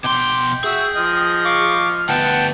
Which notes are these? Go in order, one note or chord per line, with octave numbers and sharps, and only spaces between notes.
B2 G5 C6 D6
F#4 G#4 E5
F3 D#5 F6
F5 C#6 D6
D2 B3 F#5 G5 A5